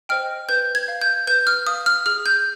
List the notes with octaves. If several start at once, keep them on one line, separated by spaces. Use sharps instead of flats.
C5 D#5 G5 F6
B4 G6
G#6
F5
G6
B4 G6
F6
F5 D#6
F6
G#4 F6
G6